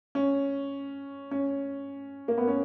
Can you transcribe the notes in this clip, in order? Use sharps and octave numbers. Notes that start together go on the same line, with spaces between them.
C#4
C#4
A#3
B3
C#4